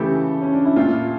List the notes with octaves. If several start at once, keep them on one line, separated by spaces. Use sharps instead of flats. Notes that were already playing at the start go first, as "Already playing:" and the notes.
Already playing: C#3 E3 A3 G4 A4
C#4
D4
E4
A#2 A3 F4